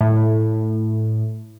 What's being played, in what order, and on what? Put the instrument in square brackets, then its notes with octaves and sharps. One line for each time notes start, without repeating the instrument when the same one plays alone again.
[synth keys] A2